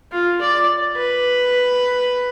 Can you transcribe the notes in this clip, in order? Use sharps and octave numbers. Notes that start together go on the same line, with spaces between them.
F4
D5
B4